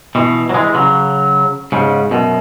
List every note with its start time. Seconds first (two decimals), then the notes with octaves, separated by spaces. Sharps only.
0.15 B2 E3
0.49 F#3
0.54 E3 G#3
0.74 C#3 F#3
1.72 G#2 C#3
2.11 F#2 B2